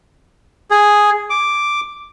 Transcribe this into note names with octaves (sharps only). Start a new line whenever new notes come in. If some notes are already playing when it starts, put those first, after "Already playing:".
G#4
D6